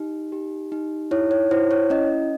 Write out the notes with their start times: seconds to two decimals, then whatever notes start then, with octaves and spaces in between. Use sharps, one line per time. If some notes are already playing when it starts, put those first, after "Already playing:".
Already playing: D#4 G4
0.32 G4
0.72 D#4
1.11 E4 C#5
1.31 C#5
1.51 E4 C5
1.71 C#5
1.90 C#4 D#5